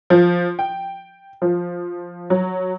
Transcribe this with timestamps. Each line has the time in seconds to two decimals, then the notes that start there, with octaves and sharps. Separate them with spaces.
0.10 F3
0.59 G5
1.42 F3
2.30 F#3